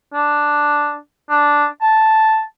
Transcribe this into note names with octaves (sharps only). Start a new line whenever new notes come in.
D4
D4
A5